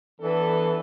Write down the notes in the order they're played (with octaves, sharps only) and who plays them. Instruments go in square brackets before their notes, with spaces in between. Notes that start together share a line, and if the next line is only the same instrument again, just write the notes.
[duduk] E3 [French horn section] B3 D4 A4